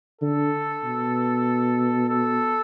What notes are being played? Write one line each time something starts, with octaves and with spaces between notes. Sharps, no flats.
D3 A4
B2
A4